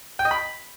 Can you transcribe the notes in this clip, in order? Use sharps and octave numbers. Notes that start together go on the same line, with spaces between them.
G5
D#5
B5